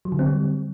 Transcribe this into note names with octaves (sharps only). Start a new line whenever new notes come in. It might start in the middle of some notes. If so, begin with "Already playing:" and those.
F#3
D3
C4
G3